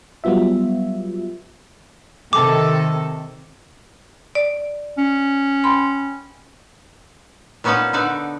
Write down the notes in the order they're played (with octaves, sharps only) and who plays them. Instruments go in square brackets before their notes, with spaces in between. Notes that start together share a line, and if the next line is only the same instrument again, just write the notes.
[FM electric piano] F#3 G3 B3 F4 E5
[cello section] C3 D#3 A4 [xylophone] D6
[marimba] D5
[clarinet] C#4
[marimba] G5 B5 C6
[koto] A#2 B3 C#4 D#4 B4 A5
D3 D#4 A4 B4 D5